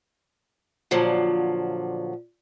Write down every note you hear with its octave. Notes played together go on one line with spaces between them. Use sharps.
A#2 D3 F3 F#3